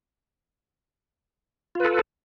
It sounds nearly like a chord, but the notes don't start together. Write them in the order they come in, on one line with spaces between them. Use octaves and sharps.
F4 B4 A4